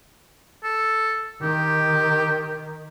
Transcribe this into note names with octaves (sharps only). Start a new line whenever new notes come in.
A4
D#3 G4